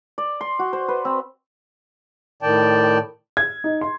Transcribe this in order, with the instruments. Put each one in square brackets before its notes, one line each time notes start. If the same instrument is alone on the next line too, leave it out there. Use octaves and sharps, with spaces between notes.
[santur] D5
C6
F#4
C5
B4
C4
[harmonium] A2 D#3 D5 G5 A5
[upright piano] G#6
D#4
C6